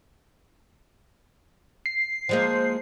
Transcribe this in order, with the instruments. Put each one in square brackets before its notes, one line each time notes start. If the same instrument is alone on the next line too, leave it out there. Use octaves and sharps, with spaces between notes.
[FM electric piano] C7
[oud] F3 G#3 A#3 [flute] C5